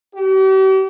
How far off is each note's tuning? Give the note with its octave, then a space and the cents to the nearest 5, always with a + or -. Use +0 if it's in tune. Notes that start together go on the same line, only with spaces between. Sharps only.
G4 -45